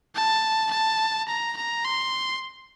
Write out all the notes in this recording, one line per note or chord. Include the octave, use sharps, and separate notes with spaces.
A5
A5
A#5
A#5
C6